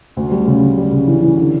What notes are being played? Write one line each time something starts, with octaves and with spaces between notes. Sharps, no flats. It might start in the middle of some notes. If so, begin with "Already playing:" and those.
D2
G3
C#3
G3
G3
C#3
E3
E3
D3